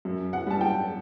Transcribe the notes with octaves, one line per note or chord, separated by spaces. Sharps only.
F#2
F#5
G3 A5
G5